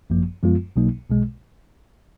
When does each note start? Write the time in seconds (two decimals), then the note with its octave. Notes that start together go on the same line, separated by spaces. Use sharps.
0.10 G#1 F#2 F3 A#3
0.43 F#2 F3 G#3 B3 F4
0.76 B1 B2 F#3 A#3 D#4
1.09 B1 B2 G#3